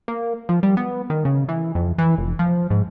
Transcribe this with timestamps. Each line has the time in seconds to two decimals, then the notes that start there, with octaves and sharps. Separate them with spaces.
0.08 A#3
0.49 F3
0.63 G3
0.77 B3
1.10 D#3
1.25 C#3
1.49 E3
1.75 F2
1.98 E3
2.18 F1
2.39 F3
2.70 G#2